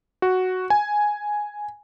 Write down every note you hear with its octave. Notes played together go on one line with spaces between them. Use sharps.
F#4
G#5